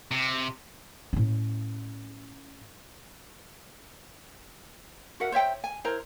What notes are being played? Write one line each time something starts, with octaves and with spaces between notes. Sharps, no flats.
C3
A2 C#4
F#4 A#4 E5 F#5
C5 C#5 E5 G5
G#5
E4 A#4 C5 A#5